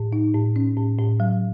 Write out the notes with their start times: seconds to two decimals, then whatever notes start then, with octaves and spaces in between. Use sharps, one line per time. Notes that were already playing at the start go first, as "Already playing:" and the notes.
Already playing: A2
0.13 D#4
0.35 A2
0.56 C#4
0.77 A2
0.99 A2
1.20 F#3